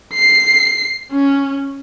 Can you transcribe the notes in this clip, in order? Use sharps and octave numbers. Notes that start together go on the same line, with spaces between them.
C7
C#4